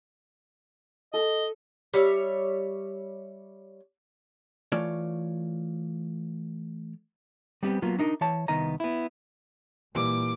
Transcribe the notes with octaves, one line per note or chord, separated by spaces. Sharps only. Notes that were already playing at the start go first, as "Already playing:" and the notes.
A4 D#5
G3 C#5 E5
E3 A3 F4 C#5 D5
G3 B3 C4 G4
F#3 A#3 B3 F4
D4 D#4 A#4
E3 C#5 A5
C2 D#3 B3 D#5 A#5
B3 E4
A#2 E3 G3 A#3 D6